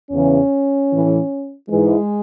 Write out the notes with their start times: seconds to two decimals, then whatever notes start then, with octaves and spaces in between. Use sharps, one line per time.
0.11 E2 C#3 E3 C#4
0.90 A2 E3
1.68 G#2 E3 G#3